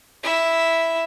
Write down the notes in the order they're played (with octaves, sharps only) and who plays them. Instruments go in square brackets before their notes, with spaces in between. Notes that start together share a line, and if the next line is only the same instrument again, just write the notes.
[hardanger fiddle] E4 E5